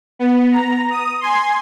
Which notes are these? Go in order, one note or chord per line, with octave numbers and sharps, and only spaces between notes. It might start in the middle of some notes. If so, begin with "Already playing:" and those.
B3
A#5
D#6
G#5 C6